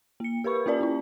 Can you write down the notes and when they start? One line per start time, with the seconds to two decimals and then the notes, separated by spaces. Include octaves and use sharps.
0.20 A#3 C#7
0.44 G4 A#4 B4 B5 C#6
0.66 A#3 C#4 F4 A#4 D5 A5
0.81 C#4 E4